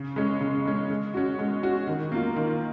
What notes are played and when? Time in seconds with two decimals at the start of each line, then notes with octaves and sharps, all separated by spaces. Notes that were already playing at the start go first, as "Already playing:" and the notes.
Already playing: C#3
0.16 G#3 C#4
0.41 C#3
0.66 G#3 C#4
0.90 G#3
1.14 C#4 F#4
1.39 G#3
1.63 C#4 F#4
1.88 D#3
2.12 A#3 F4
2.36 D#3